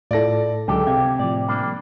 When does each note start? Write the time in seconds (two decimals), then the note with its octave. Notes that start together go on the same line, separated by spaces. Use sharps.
0.11 A2 E4 F4 A4 D5 A#6
0.68 C#2 D3 F#3 G4 A4
0.87 C3 F5 G5 G#6
1.19 A2 F3 D5
1.48 G3 A#3 D4